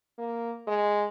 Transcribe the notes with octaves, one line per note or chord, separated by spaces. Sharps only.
A#3
G#3